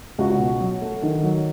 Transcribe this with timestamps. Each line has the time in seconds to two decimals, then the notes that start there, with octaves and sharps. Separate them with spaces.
0.18 C#2 F#4
0.39 B2
0.61 F#3
0.82 A3
1.03 D#3
1.23 F#3